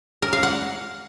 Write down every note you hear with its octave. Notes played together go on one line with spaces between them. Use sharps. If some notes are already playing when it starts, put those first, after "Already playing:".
A#4
F5
F#5